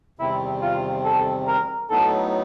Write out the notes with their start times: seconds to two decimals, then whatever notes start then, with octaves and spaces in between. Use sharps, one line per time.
0.19 E2 C3 D#3 G3 C4 E4
0.62 F4
1.04 A4
1.47 A#4
1.90 A2 F#3 B3 D#4 A4